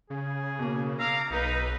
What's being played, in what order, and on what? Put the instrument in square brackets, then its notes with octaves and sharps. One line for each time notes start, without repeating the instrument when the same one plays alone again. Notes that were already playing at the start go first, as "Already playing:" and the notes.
[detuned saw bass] C#3 [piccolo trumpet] G#4
[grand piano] B2 A#3
[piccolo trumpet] F5 [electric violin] A#5 D6 [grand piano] E6
[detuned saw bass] B1 [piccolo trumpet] D#4 [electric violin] B4